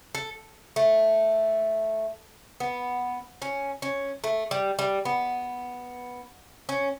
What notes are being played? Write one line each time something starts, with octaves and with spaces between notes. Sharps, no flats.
A4
A3
B3
C#4
C#4
A3
G3
G3
B3
C#4